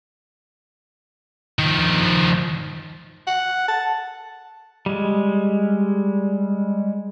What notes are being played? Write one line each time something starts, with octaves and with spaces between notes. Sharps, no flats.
D#3 F3
F#5
A5
G3 G#3